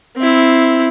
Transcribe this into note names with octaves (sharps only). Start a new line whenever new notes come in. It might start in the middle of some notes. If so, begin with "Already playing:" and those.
C4 E4